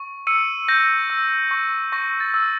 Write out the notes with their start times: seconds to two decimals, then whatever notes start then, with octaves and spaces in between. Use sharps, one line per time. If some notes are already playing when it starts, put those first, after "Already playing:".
Already playing: C#6
0.27 E6 C#7 D#7
0.68 G6 A#6
1.10 E6
1.51 C#6
1.92 C#6 A#6
2.20 A6
2.34 E6